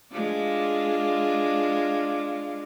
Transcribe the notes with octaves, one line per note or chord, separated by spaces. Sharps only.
G#3 D4 F4